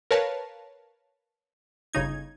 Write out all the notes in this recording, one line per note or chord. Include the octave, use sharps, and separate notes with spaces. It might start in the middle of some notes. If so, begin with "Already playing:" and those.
A#4 B4 C#5 F5 A5
G1 C#3 D#4 G#6